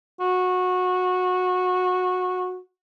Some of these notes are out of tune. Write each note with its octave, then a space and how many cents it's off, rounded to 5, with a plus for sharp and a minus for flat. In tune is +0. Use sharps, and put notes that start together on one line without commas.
F#4 -20